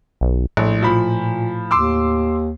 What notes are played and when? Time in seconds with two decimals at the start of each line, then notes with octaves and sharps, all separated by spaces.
0.21 B1
0.57 A#1 A2
0.82 A#2 F3 B5
1.71 D#2 C6 D6 E6